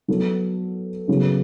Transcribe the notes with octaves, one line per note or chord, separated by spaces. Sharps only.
F#3 B3 F#4 A4
C#3 F#3 B3